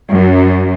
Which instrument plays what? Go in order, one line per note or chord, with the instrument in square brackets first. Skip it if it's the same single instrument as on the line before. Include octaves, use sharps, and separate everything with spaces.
[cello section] F#2